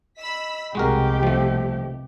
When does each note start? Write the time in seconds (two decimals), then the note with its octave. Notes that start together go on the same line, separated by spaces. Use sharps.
0.19 D#5 B5 E6 B6
0.75 C2 F2 B2 G#3 F#4 G4 A#4
1.23 F3 A3